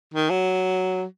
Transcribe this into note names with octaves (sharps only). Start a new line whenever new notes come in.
D#3
F#3